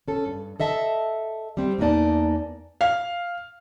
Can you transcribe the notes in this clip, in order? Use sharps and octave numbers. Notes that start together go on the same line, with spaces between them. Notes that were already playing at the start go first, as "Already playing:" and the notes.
C#4 A4
G2
A4 D#5 E5 A5
G3 C4
E2 E3 A#3 D#4 D5 A5
F5